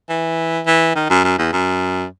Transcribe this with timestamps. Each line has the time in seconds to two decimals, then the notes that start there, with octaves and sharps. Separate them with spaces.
0.09 E3
0.66 E3
0.96 D#3
1.10 F#2
1.24 F#2
1.38 E2
1.53 F#2